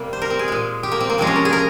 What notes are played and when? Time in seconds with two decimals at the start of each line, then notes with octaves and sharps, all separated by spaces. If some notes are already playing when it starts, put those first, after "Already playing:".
Already playing: C3 G3 A#3
0.13 C5
0.22 A#4
0.30 C4
0.39 G#4
0.48 A#2 G#3
0.83 G4
0.92 A#3
1.00 C4
1.10 A#3
1.18 C3 F3 G#3 C4
1.27 C#4
1.36 A#4
1.45 G#4
1.53 A#4